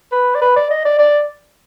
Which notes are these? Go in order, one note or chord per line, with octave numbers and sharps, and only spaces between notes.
B4
D5
B4
D5
D#5
D5
D5